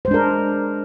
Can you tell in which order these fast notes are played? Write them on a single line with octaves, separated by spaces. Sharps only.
C5 G#3 D4 A#4